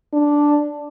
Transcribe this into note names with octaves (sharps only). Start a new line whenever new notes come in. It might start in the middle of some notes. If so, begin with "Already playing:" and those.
D4